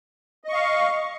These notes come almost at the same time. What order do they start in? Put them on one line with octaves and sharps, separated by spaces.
D#5 C#6 F5